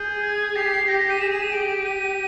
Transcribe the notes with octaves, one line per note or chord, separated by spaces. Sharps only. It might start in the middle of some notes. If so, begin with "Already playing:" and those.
Already playing: G#4 G6
G#6
G4 C7
G4 A#6
A#6
D#7
G#4 E7
E7
D#7
G4 D7
D#7